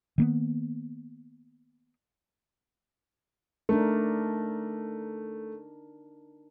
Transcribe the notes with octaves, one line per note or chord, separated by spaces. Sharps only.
D#3 A#3 B3
A3 D4 D#4 A#4